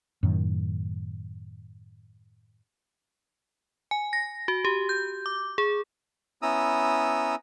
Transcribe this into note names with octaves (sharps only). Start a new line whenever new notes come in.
F#2 A2 D#3
G#5
A#6
F#4
G4
G6
D6
G#4
B3 C#4 E4 A#5 D#6 E6